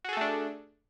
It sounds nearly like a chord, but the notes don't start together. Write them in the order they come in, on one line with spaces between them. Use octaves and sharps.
F#4 G#4 A4 A3 D4